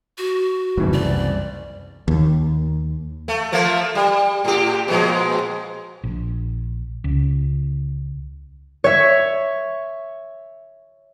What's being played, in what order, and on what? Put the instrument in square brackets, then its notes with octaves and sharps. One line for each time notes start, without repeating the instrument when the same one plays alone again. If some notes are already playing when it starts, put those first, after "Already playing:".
[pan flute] F#4
[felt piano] F#1 E3 [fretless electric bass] C2 F2 G#2
[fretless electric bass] C2 [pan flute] D5
[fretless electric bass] D#2
[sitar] A3
F3 A3 A#3
G3
A2 G4
A#2 F3 G#3
[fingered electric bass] A#1
C#2
[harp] C#5 E5